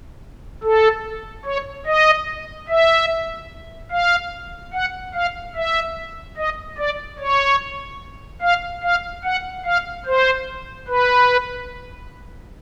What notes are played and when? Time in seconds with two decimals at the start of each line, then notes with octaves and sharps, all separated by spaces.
0.64 A4
1.45 C#5
1.86 D#5
2.68 E5
3.91 F5
4.73 F#5
5.14 F5
5.55 E5
6.37 D#5
6.78 D5
7.19 C#5
8.41 F5
8.83 F5
9.24 F#5
9.65 F5
10.06 C5
10.88 B4